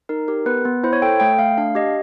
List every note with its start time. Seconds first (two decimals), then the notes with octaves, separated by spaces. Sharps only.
0.09 D#4 A#4
0.28 G4 A#4
0.46 B3 B4
0.65 B3
0.83 E4 C5
0.93 C#5
1.02 A4 G5
1.20 A3 G5
1.39 A3 F5
1.58 D4 F5
1.75 G4 D#5